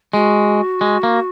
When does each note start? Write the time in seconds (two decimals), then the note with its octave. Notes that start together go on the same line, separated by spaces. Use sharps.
0.13 G#3 F#4
0.81 G#3
1.03 A#3